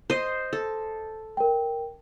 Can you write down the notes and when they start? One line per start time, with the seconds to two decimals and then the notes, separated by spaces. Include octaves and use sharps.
0.10 C5 D#5
0.53 A4
1.37 A#4 G5